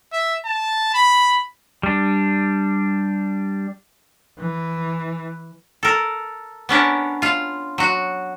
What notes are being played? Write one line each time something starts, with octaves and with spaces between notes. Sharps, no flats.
E5
A5
B5
G3 D4
E3
A4 A#4
B3 C#4 D4 A#4
F4 F5
F#3 F#4